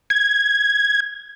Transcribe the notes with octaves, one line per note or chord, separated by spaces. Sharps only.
G#6